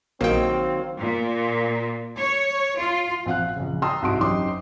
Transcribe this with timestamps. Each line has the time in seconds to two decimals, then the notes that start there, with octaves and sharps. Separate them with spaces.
0.21 A#1 D#3 F#3 A#3 C4 G5
0.99 A#2
2.17 C#5
2.78 F4
3.26 A#1 C4 F5 F#5 F#6
3.56 A#1 C#3
3.82 G5 A5 A#5 C6 D#6 E6
4.02 C2 G#2 F#4 A5 C6 D7
4.21 F#1 C#4 D#4 G4 C6 D6